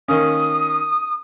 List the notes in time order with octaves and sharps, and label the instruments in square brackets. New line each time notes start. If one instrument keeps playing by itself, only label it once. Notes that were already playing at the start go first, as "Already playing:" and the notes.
[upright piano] D#3 A#3 C#4 [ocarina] D#6